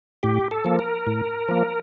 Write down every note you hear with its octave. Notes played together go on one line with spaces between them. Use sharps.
A2 G4
A4
F3 A#3
A#4
A2
F3 A#3